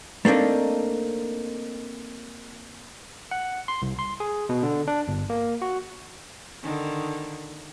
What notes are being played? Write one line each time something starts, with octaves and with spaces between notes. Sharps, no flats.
A3 A#3 C4 D4 D#4
F#5
C6
C2
C6
G#4
B2
D3
D4
G1
A#3
F#4
D3 D#3